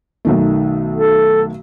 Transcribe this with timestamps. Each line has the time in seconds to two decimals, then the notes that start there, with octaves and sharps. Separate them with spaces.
0.25 B1 D#3 A3
0.96 A4